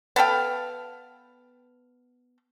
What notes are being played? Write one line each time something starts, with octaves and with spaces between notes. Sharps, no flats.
B3 A4 F5 G5